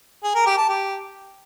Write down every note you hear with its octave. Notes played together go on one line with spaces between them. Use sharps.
G#4
A#4
G4
A5
G4